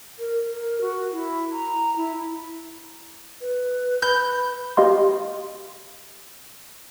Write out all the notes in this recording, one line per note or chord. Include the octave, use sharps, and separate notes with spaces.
A#4
A#4
F#4
E4
A#5
E4
B4
B5 G6
G4 D#5 F5 C6